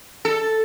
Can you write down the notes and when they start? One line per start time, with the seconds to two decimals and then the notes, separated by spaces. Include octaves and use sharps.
0.25 A4